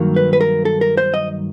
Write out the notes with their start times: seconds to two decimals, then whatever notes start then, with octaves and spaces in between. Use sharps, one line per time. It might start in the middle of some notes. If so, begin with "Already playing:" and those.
Already playing: G2 D#3 F#3 A#3
0.16 B4
0.33 B4
0.41 A#4
0.65 A4
0.81 A#4
0.97 C5
1.14 D#5